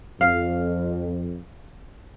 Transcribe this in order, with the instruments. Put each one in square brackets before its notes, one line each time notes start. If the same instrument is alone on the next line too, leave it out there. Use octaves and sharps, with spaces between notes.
[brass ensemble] F2 [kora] F5